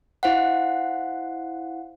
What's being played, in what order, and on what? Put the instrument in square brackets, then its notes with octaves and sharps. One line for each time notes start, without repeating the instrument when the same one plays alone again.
[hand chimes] E4 C5 F5 F#5